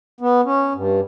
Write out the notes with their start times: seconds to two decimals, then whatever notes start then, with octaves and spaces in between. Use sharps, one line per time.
0.21 B3
0.45 C#4
0.75 G2